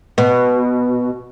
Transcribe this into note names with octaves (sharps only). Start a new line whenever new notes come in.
B2